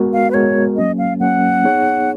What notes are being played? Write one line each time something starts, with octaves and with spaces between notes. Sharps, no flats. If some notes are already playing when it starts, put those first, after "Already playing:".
Already playing: G#3 B3 F#4 A#4
F5
B4
G#3 B3 F#4 A#4 C#5
F#3 A#3 C#4 D#5
F5
F#3 A#3 C#4 F#5
B3 D#4 G#4 C#5